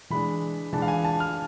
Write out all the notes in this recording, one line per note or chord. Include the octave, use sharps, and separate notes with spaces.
E3 G#3 D4 B5
E3 G#3 D4 A5
F5
G#5
A5
F6